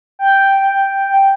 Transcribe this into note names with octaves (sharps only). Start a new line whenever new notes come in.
G5